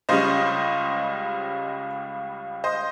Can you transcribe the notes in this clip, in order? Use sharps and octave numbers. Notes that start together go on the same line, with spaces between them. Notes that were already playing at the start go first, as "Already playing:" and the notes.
C#2 C#3 G3 C#4 C5 D#5
C5 D#5